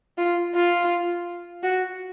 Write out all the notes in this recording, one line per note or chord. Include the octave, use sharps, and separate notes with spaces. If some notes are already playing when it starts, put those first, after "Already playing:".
F4
F4
F#4